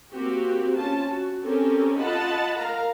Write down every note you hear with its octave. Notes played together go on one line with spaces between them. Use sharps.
A#3 C4 F#4 G4
C#4 F4 A5
F#4
C4 C#4 G4 A4 A#4
F4 D#5 F#5 A5 B5
A#4 F5 A#5